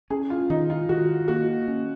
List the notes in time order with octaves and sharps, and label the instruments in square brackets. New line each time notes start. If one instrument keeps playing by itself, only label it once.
[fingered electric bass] C#4 [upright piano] G#4
[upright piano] F4
[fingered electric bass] D#3 [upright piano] D#4
[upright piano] F4
[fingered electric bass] D#3 [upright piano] F#4
[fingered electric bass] A#3 [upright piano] F#4
[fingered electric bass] C#4